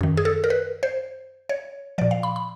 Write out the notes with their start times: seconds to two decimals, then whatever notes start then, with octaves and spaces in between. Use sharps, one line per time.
0.01 F#2 D#3
0.17 G#4
0.25 A4
0.44 A#4
0.50 B4
0.83 C5
1.49 C#5
1.98 A#2 F3 D5
2.11 F5
2.23 B5
2.36 B5